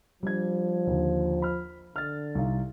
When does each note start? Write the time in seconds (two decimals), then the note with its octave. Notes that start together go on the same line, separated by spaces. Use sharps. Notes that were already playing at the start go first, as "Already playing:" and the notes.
0.23 F3 G3 D4 G#6
0.87 D#2 D3
1.42 B5 F6
1.96 D3 F6 A6
2.35 C2 D#4 F5